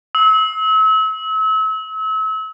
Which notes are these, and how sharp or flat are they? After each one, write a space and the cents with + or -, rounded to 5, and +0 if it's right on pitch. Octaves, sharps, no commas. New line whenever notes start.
E6 -35